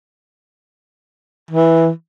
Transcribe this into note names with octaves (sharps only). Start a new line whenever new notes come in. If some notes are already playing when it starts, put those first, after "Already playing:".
E3